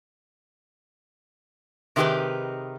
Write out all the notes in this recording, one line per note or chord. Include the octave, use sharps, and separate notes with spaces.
C3 D#3 D#4 G4 G#4 B4